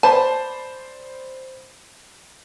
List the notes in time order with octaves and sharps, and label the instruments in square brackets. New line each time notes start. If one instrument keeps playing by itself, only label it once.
[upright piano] C5 D5 B5 [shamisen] A5